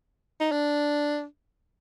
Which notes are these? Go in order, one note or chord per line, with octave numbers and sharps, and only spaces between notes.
D#4
D4